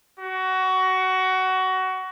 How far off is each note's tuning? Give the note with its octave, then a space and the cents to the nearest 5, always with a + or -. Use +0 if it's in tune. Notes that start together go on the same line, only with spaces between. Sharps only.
F#4 +20